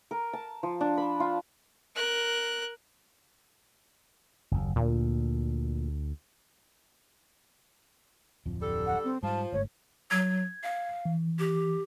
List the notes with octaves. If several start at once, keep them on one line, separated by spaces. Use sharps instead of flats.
A#4
A5
F3
D4
B5
F4
A#4 F#6
F#1 D#2
D2 A#2
D1 F2 F3
D3 G3 A4
F#5
C4
G#2 F3 G3 A5
G1 G#2 A3 C#5
F#3 G#6
F5
E3
G4